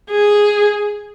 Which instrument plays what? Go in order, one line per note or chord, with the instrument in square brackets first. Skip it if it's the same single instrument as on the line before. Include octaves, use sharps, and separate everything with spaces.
[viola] G#4